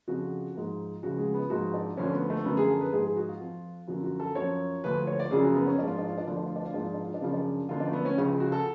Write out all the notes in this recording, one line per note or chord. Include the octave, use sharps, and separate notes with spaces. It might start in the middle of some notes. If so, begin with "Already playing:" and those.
F2 C#3 F3 F#4
G#2 F3
C#2 C#3 F3 F#4
G#3
B3
G#2 F3 F#4
D4
D2 D3 F3 C#4
B3
A3
F#2 D3 F3 B3
G#4
A4
B4
G#2 F3 G#4
G#4
F#4
F4
F2 F3
F#2 D3 F3 F#4
F#4
A4
F#2 F3 C#5
D2 D3 F3 B4
C#5
D5
F#2 C#3 F3 G#4
F#4
B3
C#4
G#2 F3 D4
F4
D4
F4
D4
D2 D3 F3 F4
D4
F4
D4
F4
G#2 F3 D4
F4
D4
F4
D4
F#2 C#3 F3 F4
D4
F#2 D3 F3 F4
D4
A3
B3
C#4
C#2 C#3 F3
F4
F#4
A4